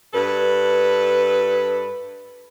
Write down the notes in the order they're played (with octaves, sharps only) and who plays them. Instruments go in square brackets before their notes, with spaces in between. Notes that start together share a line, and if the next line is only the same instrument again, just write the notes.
[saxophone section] G2 A4 B4